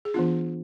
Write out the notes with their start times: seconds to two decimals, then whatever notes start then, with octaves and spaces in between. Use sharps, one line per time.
0.05 G#4
0.14 E3 B3 D4 F4